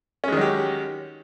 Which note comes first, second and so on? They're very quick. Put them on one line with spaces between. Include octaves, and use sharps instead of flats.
C#4 G#3 D#3 F#3 G4